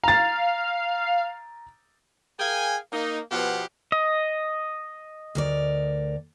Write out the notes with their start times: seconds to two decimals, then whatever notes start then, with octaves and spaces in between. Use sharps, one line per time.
0.03 F5 A#5 A6
2.39 G#4 A#4 F5 G5 G#5
2.92 A#3 D#4
3.31 B2 F3 B3 F4 G4 F#5
3.92 D#5
5.35 D2 A#4 D5